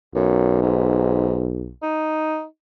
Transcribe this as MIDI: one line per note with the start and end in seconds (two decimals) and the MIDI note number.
0.15 1.72 35
0.15 0.58 42
0.62 1.45 44
1.82 2.44 63